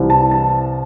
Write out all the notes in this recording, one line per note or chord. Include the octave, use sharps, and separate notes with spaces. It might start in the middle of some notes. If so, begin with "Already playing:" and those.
Already playing: C2 C3 E3
A5
A5